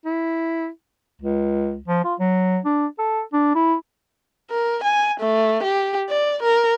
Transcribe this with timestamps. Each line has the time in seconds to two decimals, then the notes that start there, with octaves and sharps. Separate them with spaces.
0.05 E4
1.21 C#2
1.88 F3
2.04 F4
2.20 F#3
2.65 D4
2.98 A4
3.33 D4
3.55 E4
4.50 A#4
4.83 G#5
5.20 A3
5.63 G4
6.09 D5
6.43 A#4